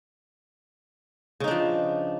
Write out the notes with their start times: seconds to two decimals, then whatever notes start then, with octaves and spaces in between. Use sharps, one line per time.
1.40 C#3
1.44 D#4
1.48 D4
1.51 F3